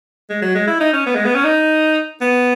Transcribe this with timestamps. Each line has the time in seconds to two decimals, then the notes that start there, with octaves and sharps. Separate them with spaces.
0.30 G#3
0.42 F#3
0.55 G#3
0.68 E4
0.80 D#4
0.93 C#4
1.06 B3
1.15 G#3
1.25 B3
1.35 C#4
1.44 D#4
2.21 B3